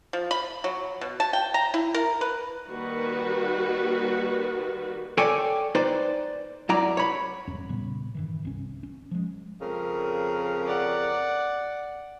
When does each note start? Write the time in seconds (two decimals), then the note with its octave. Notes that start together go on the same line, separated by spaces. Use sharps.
0.13 F3
0.31 B5
0.64 F#3
1.01 B2
1.20 A5
1.33 G5
1.54 A#5
1.74 E4
1.94 A#4
2.21 B4
2.70 D#3 G3 A#3 F#4 B4
5.18 A4 C#5 D5 G5 G#5
5.75 D#4 B4 C5 D5
6.69 F#2 E4 D5 A#5
6.97 C#5 B5
7.47 E1 E2 G2 C#4
7.69 A#2 C#3 G3 B3
8.15 G2 D#3 E3
8.43 G1 C2 C#4
8.83 C#4
9.11 F3 G#3
9.60 F2 C#3 A#4
10.67 D5 F#5